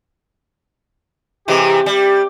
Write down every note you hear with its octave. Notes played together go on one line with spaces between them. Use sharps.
C3 E3 G#3 G4
G3